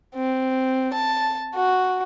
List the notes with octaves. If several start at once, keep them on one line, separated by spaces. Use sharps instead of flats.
C4
A5
F#4